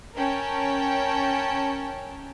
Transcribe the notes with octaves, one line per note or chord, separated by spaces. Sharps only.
C#4 A#4 G5 A5